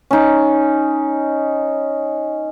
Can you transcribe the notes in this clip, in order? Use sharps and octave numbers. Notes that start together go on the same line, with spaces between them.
C#4 D#4